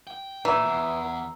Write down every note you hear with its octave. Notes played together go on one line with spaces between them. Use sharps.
G5
A#2 E3 A#5 E6
E2